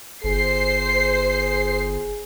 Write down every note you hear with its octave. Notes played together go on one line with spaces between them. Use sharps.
G1 G#4 C5 C7